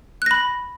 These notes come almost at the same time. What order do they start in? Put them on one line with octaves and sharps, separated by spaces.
F#6 A#6 B5